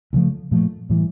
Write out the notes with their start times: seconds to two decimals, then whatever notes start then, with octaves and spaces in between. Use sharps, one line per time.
0.13 D2 C#3 F3 A3
0.51 A#2 F3 A3
0.90 A2 E3 G3